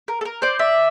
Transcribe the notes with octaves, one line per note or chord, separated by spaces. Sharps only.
A#4
A4
A#4
C5 D5
D5 E5